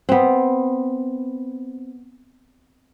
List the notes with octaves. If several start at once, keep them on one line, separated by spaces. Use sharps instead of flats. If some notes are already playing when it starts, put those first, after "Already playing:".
B3 C4